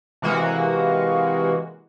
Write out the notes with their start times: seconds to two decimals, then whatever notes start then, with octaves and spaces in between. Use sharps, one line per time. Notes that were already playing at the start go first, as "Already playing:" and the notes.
0.22 C3 E3 G#3 A#3 F#4